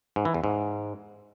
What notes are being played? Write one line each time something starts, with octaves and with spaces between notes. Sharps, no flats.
G#2
E3
E2
G#2